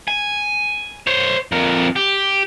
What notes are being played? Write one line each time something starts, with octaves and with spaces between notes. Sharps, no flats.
G#5
C5 C#5
F2 A#4
G4